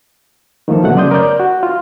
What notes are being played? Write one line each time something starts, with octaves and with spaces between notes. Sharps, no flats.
D#3 F3 A3 A#3 A4
D2 B2 F#3 A3 F#5
F#2 C#3 D5 C6 D#6 G6
A#4 C#5 D5 G6
F#4
F4